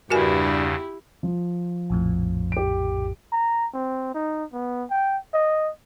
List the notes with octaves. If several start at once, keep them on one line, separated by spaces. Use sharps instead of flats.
E2 G2 C#3 E4 F#4 G4 A#4 G#5
F3
A#1 F2 A2
G4 D7
A#5
C4
D#4
B3
G5
D#5